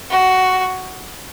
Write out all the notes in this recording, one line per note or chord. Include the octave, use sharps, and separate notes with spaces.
F#4